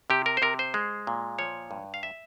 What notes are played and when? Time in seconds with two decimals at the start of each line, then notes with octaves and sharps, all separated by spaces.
0.10 C3 G4
0.26 A#4
0.37 C5
0.42 C3 A#4
0.59 C5
0.74 G#3
1.07 A#2
1.39 F3 C#5
1.71 G2
1.94 F5
2.03 E5